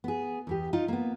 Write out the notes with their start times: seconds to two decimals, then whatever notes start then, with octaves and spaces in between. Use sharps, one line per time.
0.04 B3 G#4
0.47 E2 B3 G4
0.73 D#4 F4 D#5
0.88 A#3 B3